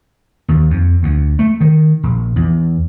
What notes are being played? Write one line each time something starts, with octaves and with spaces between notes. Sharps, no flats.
D#2
F2
D2
A3
D#3
A#1
E2